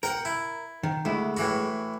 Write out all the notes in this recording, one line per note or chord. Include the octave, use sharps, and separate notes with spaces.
A#4 F#5 G5
E4
D#3
D2 G#3 E4
A2 E3 F#4